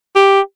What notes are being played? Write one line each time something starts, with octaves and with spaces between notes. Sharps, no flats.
G4